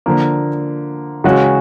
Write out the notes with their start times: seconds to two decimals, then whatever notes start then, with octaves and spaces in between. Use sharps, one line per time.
0.06 D3 F3 A#3
1.24 C#3 E3 G#3 C#4 F#4